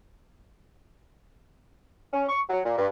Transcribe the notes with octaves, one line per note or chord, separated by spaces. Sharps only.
C#4
C#6
F#3
A#2
G2